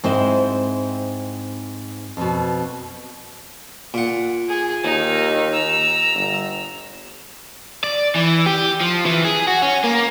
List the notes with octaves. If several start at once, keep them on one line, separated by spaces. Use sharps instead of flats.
G#2 C4 E4 C5
F2 B2
A#2 F#5
G#4
D#2 D#4
A#5 E6
G1
D5
E3
G4
F3
E3
G#4
F#4
C#4
A#3